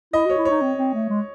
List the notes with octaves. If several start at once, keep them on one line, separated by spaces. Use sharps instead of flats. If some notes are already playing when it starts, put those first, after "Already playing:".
E4 D#5
F#4
C#5
E4
D#4 C#5
C4
C4
A3
G#3